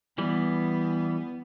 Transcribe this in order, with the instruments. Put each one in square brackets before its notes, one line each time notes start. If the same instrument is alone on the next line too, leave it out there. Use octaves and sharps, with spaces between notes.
[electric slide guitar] E3 G3 [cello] B3